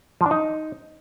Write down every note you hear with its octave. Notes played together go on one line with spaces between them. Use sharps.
F3
D4
D#4